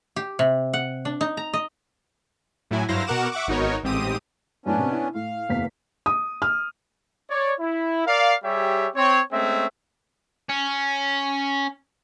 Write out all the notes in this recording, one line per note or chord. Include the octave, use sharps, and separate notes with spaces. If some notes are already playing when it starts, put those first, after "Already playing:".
G4
C3
F#5
D4
D#4
A#5
D#5
A2 F#3 E4 G#5
G2 F#3 E4 C5 F5 A#6
B2 F#4 A#4 F#5 D6 E7
E5 F#5 C#6 D6
G#1 B3 D#4 F#4 A#4 C#5
A1 G#2 C4 G4 D#6 D#7
F#2 A2 B3 C#4 D4
C3
E4
A2 F5
F#1 E2 B6
D#6
F6
C#5 D5
E4
A#4 D5 F5
G3 G4 G#4 C#5 E5
C4 C#5
G#3 A3 C4 C#4 E5
C#4